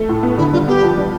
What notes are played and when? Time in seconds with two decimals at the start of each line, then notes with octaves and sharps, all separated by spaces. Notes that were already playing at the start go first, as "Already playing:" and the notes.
Already playing: A3
0.09 A2
0.23 B3
0.37 D3 E4
0.53 G3 F4
0.68 B3 G4
0.83 F3
0.98 G3